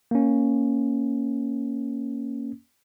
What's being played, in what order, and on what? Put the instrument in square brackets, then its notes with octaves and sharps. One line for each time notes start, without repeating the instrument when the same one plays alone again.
[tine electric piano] A#3 C#4